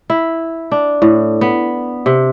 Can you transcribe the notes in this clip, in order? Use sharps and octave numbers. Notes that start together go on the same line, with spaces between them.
E4
D4
A2
B3
C3